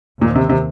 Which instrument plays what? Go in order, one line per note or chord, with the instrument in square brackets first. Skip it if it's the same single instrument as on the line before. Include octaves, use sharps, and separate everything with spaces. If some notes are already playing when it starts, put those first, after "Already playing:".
[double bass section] D#2 D#3 C4 [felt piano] A#2
[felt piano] C3
C3